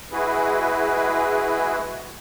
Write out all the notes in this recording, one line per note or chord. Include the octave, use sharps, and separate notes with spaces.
G#3 E4 F#4 G#4 B4